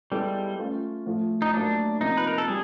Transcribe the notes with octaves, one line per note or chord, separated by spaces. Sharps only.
G3 G#3 B3 E4 A4
A3 C#4 F4
A2 F3 A3
D#4
A2 F#3 A#3 D4
C3 F3 A#3 D#4
B4
A#4
A4
G3 G#4